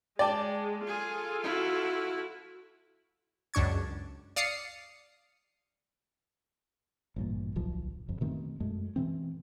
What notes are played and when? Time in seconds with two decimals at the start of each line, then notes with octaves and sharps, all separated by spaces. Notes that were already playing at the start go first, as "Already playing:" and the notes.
0.19 G#3 D5 G5 A5
0.87 F4 G#4 A4
1.43 E4 F#4
3.54 C#2 F#2 D4 C#6 G#6
4.36 D5 F5 D#6 C7 C#7
7.16 A1 G2 A#2
7.56 D1 B1 F3
8.09 G1 F2
8.21 B2 D#3 A3 C4
8.60 F#2 G#3 A3
8.96 B2 E3 C4